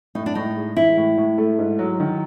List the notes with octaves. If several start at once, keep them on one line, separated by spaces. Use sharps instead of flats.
A2 D#4
D4
A2 D#4
G#3
E3 E4
A2
A2
A3
G#2
F#3
D#3